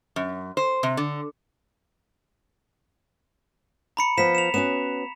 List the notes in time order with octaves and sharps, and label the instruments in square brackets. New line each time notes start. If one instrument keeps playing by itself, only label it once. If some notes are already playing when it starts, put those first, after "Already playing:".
[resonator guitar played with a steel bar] F#2
C5
C3
D3
[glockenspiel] A#5 B5 C#7
[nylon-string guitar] F3 B3 [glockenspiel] B6 E7
[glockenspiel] E7 F7
[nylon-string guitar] B3 C#4 F#4 [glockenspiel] E7